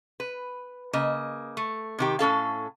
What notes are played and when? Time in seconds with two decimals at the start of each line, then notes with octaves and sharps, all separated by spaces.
0.20 B4
0.93 C#3 A#3 D#5
1.57 A3
1.99 C3 D#3 G4
2.19 A2 C#4 A4 F5